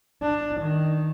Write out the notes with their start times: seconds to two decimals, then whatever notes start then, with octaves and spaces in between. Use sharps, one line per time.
0.22 D4
0.61 D#3